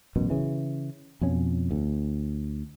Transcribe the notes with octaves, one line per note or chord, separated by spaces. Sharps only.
A1 F#2 B2
C#3 E3
F2 B2 C#4
D2